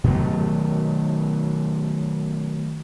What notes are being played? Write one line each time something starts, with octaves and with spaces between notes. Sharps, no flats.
B2 D#3 F#3 A3